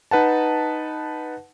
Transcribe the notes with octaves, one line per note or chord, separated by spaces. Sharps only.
D#4 B4 F#5 A5